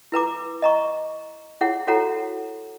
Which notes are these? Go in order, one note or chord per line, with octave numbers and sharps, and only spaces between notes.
E4 B4 A#5 D6
D#5 A#5 C#6
E4 G#4 C#5 F#5
E4 F#4 A4 C#5 F#5 A#5